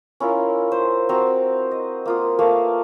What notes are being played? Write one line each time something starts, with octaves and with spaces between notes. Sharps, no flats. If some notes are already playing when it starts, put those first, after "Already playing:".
C#4 E4 F4 A#4
C5
C4 F#4 C5 A#5
D#5
A#3 F4 D#6
A3 A#3 B4 F5